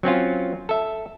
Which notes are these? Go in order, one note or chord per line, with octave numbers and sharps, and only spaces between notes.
F#3 C4 C#4 F4
A4 E5